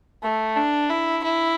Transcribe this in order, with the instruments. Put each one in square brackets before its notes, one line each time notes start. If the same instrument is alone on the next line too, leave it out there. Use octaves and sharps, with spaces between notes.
[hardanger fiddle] A3
D4
E4
E4